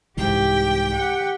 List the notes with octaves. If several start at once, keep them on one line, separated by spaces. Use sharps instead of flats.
C2 G#2 E3 G4 G5
G4 F#5